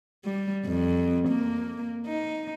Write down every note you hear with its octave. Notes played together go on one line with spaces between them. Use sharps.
G3
F2
A#3
D#4